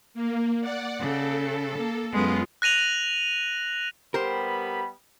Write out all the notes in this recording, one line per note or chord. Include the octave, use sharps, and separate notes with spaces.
A#3
D5 F#5
C#3 A4
A#3
F#2 G#3 B3 F4
F#6 A#6 D#7 F7 F#7
G3 B3 G4 A#4 C5 B5